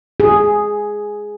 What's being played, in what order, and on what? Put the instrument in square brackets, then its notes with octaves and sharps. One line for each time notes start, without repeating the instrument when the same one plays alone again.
[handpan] G#4